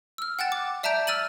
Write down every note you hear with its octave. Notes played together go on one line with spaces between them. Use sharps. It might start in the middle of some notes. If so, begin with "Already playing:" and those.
E6 F6
F#5 G5 F#6 A6 E7
D6
D5 E5 A5 A#5 G6 D7
E6 F6 A6 D#7 F#7